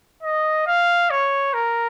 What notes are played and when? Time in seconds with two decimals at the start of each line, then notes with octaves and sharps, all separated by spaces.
0.23 D#5
0.67 F5
1.11 C#5
1.54 A#4